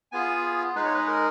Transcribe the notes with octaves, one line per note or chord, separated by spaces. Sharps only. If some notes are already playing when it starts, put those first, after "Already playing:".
B3 F4 G#4 G#5
G#3 D#4 G#4 B4
C#5
B4
A#4